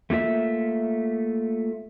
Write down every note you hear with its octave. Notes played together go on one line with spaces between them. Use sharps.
A3 A#3 F4 E5